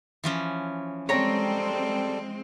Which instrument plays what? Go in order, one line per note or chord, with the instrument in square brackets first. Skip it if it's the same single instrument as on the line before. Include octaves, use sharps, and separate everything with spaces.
[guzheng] E3 F3 C#4
[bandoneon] G3 A4 [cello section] G#3 C4 [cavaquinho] C#5 A#5